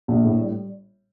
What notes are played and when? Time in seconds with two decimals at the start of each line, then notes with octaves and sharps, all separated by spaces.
0.08 A#1
0.25 A2
0.40 G3